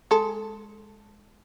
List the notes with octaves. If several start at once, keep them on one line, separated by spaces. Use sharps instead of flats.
G#3 A4